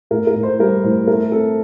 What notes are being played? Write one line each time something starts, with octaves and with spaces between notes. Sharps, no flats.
A2 A#4
A#4
A2
C5
G3 A#4
A2 C5
A3 A#4
C4 A4